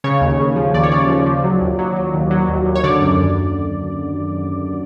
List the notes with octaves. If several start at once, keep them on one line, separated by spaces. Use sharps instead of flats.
C#3 C#5
D#2
C#3
F3
D#2 D5
C#5
C#3 D5
F3
F3
F#3
D#2
F#3
F#3
D#2
F#3
D#2
D#2
C#5
D3 D5
F#2